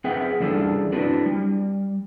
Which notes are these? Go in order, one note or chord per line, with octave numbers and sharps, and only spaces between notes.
C4 G#4 B4 E5 F#5 G5
E3 G3 C#4 D4 G#4 A4
C4 D4 E4 F#4 B4 D5
G3